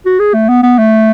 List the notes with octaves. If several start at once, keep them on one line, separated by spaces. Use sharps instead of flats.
F#4
G#4
A3
B3
B3
A3